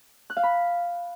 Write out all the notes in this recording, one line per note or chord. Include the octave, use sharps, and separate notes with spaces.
F#6
F5
B5